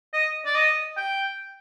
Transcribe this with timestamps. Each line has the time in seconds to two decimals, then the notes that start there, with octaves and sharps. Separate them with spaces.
0.13 D#5
0.46 D5
0.55 D#5
0.97 G5